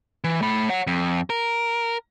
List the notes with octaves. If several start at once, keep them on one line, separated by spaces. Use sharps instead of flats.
E3
A3 B5
C#5 F#5
F2
A#4